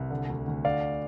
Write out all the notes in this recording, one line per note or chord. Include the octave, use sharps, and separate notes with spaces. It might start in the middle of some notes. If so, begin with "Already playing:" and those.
Already playing: C2
D3
D2
D2
D3 D5 F5